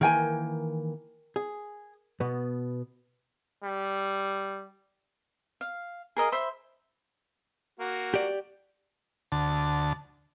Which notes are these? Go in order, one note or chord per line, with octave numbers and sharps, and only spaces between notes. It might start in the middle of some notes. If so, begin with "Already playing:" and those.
D#3 E3 A#3 A#4 G5 G#5
G#4
B2 B3
G3
F5
G#4 A#4 D#5 F5
C5 E5 B5 C6
A#3 F#4
G4 D5
D2 A5